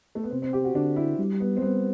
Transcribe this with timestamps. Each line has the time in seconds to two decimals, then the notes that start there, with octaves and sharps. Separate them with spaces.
0.15 A3
0.23 B3
0.31 C3 C4
0.42 C4
0.53 G4
0.64 F#4
0.74 D3 D4
0.96 E4
1.18 G3
1.40 B3
1.57 C4
1.62 G3 B3